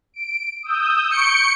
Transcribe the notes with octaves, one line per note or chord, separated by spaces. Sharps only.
D7
D#6 E6 G6
C#6 G6 C#7 D7